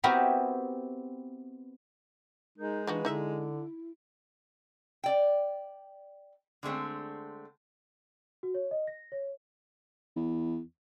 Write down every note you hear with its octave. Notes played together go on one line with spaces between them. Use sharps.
B3 C4 E4 F#4 G4 A#4
G#3 D#4 A#4 D#6 G6
E3 F3 D4 D#4 F#4 B4
D3 D#4 E4 E5
D5 G5
D3 G#3 A3 C4
F#4
C#5
D#5
A#6
C#5
E2